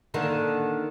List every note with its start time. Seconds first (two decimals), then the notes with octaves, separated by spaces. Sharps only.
0.14 D3 D#3 A#3